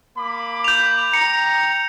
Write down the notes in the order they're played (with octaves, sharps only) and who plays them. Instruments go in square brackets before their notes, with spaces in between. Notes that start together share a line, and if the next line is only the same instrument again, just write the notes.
[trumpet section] A#3 B5 D6
[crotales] G6 F7
[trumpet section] G5 A#5 [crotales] C#7